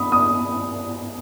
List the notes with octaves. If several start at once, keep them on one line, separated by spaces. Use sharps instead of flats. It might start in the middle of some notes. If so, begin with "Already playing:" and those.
Already playing: B5 D#6
D#6